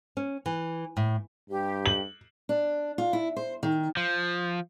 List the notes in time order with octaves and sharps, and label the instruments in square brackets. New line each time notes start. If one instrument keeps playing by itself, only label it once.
[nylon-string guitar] C#4
E3
A2
[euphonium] G2 [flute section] G4
[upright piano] F#7
[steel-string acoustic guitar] D4
F4
E4
C5
D#3
[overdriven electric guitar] F3